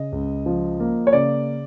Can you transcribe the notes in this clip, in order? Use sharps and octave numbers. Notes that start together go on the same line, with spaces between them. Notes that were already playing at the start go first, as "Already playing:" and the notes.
Already playing: C#3 D#5
C#2
F3
A#3
C#5
C#3 D5